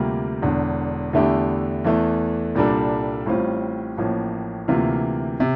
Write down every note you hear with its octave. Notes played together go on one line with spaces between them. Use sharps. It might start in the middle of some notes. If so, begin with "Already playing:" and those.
Already playing: D2 C3 G3 A#3 F4
E1 E2 D3
E2 D3 A3 E4 G4
E2 E3 A3
C2 A#2 G3 D4 A4
A1 A2 G3 C4 F4
A1 A2 F3 A#3
D2 C3 E3 A#3 F4
C3